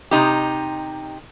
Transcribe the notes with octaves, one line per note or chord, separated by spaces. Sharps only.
C3 D#4 G4